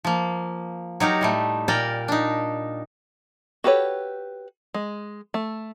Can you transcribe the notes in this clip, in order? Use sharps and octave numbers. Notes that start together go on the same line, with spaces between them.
F3 A#3
F#3 D#4 G4 A#4
A2 G3 A3
A#2 A#4 D5 G5
D4 D#4
F#4 G4 A4 B4 C#5
G#3
A3